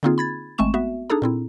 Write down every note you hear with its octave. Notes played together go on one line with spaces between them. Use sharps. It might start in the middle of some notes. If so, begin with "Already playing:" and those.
D3 A#3 C4 D#4 F4 G#4
B5 G#6 A6
G#1 G#3 A3 C4 C#6 E7
B3 F#4 E5
D4 D#4 G#4 A4 A#5
A#2 C4 E4